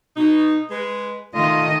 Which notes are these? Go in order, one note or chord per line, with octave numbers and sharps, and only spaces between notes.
B2 D#4
G#3 B4
D#3 A3 F4 D#5